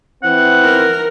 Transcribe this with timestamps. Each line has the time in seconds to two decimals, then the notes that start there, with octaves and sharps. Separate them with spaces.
0.23 E3 C4 F#5
0.64 A#4